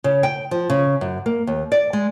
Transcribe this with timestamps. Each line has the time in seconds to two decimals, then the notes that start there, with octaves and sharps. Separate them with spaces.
0.04 C#3
0.23 G5
0.51 F3
0.70 C#3
1.01 F#2
1.26 A#3
1.47 D#2
1.72 D5
1.93 G#3